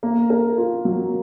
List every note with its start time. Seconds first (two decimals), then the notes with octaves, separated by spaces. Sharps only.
0.03 A#3
0.30 A#4
0.58 F4
0.85 F#3